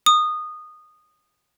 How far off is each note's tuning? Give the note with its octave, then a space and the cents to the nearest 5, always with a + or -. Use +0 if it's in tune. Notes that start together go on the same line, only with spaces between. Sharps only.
D#6 -15